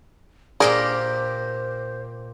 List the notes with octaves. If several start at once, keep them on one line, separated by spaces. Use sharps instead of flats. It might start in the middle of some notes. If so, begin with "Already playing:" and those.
A#2 G4 G#4 A#4 C5 D5